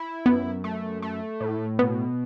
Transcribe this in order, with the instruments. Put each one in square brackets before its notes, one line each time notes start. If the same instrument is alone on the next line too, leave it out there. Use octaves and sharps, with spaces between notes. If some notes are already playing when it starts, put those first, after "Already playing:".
Already playing: [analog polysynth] E4
[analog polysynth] F#2 [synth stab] B3
[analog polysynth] A3
A3
A2
[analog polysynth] B2 [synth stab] B3